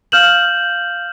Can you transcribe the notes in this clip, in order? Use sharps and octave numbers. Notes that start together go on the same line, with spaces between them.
F5 F6 G6 E7 F#7